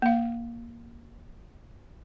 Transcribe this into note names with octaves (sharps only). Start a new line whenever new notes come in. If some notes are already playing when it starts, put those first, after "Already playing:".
A#3 F5